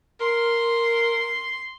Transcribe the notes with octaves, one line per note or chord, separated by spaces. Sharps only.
A#4 C6